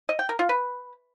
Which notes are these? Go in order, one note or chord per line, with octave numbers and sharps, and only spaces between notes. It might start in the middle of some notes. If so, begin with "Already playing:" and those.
D#5
G5
A#4
F4
B4